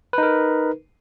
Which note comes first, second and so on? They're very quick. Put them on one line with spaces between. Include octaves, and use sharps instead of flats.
B4 D#4 A#4